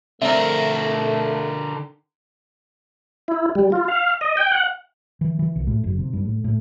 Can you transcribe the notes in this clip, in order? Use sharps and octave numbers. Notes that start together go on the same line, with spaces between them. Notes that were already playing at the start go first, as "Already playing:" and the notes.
D3 A3 C4 A#4 D5 E5
E4
G3
F4
F5
D#5
G5
F#5
E3
E3
C2
A2
F#1
C3
G2
A2
A2